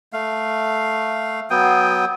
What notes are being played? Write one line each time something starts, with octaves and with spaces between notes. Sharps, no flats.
A3 F5
F#3 B3 G5 D#6